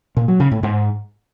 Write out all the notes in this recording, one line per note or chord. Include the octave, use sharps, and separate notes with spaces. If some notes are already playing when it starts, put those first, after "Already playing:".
A#2
F#3
C#3
A2
G#2